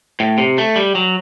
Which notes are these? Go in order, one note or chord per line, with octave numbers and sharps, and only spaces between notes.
A2
C3
A3
G3
F#3